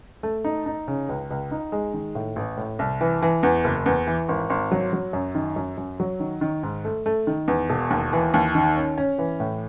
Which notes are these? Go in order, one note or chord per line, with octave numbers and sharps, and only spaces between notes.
A3
D#4
D#4
C#3
C#2
C#2
D#4
G#3
D#3
A2
A1
A2
C2
E3
E3
E2
F#1
E2
E3
G#1
G#1
F#3
F#3
F#2
D#3
F#2
F#2
F#3
D#3
D#3
G#2
A3
A3
D#3
E2
E1
D#2
E3
D#2
D#3
C#4
C#4
E3
A2